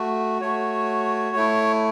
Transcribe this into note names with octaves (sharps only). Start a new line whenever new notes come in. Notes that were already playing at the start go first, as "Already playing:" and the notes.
Already playing: A3 F#4
A3 F#4 C#5
A3 E4